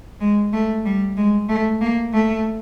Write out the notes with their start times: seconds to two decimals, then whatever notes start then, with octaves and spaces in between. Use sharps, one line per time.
0.21 G#3
0.53 A3
0.86 G3
1.17 G#3
1.49 A3
1.81 A#3
2.13 A3